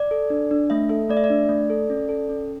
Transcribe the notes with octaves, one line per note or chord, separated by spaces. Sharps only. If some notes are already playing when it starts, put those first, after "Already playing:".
Already playing: D5
A4
D4
D4
A3 E5
A4 E5
A3 D5
E5
D5
D4
A3
A4
C#4
A4
C#4